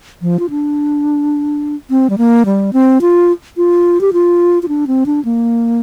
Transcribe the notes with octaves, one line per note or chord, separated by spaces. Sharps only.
F3
F4
D4
C4
G3
A#3
G3
C4
F4
F4
G4
F4
F4
D4
C4
D4
A#3